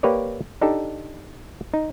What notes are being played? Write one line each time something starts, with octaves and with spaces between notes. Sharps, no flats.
A#3 G4 B4 C#5 D5
D4 D#4 G4 A4
D#4